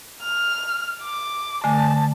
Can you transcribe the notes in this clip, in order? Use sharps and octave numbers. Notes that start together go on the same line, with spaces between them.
F6
D6
D3 A3 G#5 A5